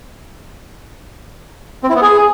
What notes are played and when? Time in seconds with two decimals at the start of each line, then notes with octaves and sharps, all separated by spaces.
1.83 C4
1.89 E4
1.96 B3
2.02 G#4